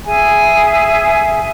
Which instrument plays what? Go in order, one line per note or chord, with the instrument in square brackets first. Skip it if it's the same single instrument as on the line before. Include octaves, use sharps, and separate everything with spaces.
[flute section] G#4 E5 G#5